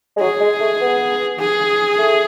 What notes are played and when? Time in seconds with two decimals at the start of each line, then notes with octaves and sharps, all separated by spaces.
0.16 G#3
0.20 F#3 G#4
0.41 G#3
0.60 A3
0.81 B3
1.39 G#4
1.98 A3